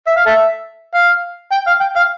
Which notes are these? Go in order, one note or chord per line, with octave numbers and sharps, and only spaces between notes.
E5
F5
A4 E5
F5
G5
F5
G5
F5